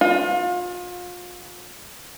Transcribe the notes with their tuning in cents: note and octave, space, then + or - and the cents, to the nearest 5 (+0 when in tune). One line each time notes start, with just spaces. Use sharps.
F4 +35